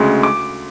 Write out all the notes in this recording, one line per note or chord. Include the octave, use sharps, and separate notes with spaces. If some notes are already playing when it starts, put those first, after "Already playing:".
Already playing: D2 C#3 G#3
D6